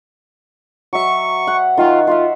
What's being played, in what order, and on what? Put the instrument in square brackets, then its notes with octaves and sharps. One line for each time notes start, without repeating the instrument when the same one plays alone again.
[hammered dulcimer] F#3 E5 [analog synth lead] C#6
[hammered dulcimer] F#5
[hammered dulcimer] D#3 E5 C#6 [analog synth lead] F4
[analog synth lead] F4 [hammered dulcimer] E5 F#5 C6